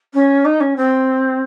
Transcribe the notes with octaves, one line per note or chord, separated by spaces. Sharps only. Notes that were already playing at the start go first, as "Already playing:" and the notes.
C#4
D#4
C#4
C4